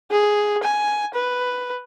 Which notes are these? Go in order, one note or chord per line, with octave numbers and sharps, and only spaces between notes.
G#4
G#5
B4